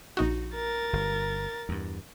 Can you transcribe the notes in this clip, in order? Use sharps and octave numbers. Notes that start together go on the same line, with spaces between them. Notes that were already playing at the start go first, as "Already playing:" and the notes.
A#1 D#4 F#4
A#4 A6
G1
E2 G2